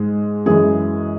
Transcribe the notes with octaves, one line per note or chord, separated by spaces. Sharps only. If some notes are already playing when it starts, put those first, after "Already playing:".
Already playing: G#2 G#3
F#2 E3 G#3 G#4